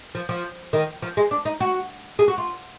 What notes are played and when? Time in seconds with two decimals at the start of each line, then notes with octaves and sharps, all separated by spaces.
0.15 F3
0.29 F3
0.73 D#3
1.02 F3
1.17 G#3
1.31 D4
1.45 D#4
1.60 F#4
2.19 G#4
2.28 F#4
2.38 F4